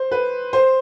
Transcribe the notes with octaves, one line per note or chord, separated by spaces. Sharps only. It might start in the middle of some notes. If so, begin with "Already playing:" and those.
Already playing: C5
B4
C5